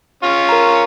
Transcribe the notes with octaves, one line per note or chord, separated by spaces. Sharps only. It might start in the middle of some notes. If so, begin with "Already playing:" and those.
C#4 F4 C#6
A#4 A#5